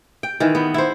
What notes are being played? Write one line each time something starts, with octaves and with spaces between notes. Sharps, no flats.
G5
D#3 E3
B3
E4 C5